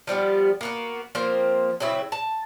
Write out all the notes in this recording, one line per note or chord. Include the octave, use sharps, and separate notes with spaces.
F3 G3 B3 G4
A#3 B3 F#4
F3 A#3 C4 C5
C#3 F#3 C4 E4
A5